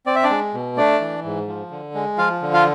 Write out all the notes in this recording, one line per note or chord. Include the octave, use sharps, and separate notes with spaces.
C4 D5
E5
D4 D5
G#3
B2
A3 D4 D5
E3
G#2
F3
D3
G#3
F3 F4 F5
D3
F4 F5